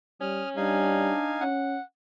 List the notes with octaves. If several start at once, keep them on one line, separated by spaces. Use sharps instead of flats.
G3 C#4 D#6 F6
G3 D4 D#4 F5 G#5
C#4 F#5